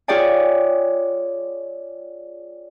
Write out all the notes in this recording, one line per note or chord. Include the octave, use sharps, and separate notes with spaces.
F4 G#4 C#5 D5 G5 G#5